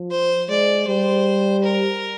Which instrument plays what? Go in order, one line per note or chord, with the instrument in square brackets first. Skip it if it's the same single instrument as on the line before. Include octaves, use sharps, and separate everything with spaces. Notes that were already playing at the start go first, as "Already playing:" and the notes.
Already playing: [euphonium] F3
[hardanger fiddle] C5
[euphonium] G#3 [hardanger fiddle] D5
[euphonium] G3 [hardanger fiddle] C5
[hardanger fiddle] A#4